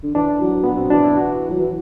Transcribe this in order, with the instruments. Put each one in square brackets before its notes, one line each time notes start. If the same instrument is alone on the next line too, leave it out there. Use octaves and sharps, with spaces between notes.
[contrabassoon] D3
[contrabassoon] E3 [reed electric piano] D4
[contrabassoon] F#3
[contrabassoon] F#3 [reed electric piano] B3
[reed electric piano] C4
[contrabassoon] E3 [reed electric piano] D4
[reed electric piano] E4
F#4
[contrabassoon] F#3
E3